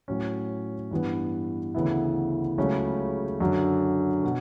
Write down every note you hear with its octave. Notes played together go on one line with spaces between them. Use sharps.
A2 F#3 C#4
G2 E3 B3
D2 C#3 E3 B3 E4
C#2 C#3 F#3 A3 C#4
F#2 D3 F#3
B2